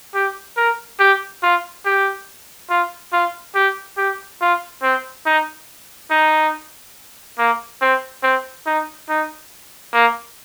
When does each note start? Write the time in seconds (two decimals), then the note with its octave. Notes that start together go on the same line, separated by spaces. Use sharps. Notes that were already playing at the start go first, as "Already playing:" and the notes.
0.14 G4
0.57 A#4
0.99 G4
1.42 F4
1.85 G4
2.69 F4
3.12 F4
3.55 G4
3.97 G4
4.41 F4
4.82 C4
5.26 D#4
6.10 D#4
7.38 A#3
7.81 C4
8.23 C4
8.66 D#4
9.09 D#4
9.93 A#3